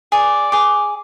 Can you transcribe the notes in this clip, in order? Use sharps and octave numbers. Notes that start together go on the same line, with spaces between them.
G#4 D5
G#4 D6